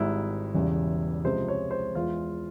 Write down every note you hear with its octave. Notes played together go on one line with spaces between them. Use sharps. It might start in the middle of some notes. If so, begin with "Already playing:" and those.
Already playing: G#1 G#2 G3 E4
E1 E2 C#3 E3 G3
C#2 C3 F3 G#3 C5
C#5
C5
E2 E3 G#3 F4